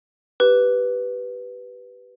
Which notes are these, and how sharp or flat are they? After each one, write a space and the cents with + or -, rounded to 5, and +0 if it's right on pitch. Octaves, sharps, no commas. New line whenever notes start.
G4 -15 B4 +0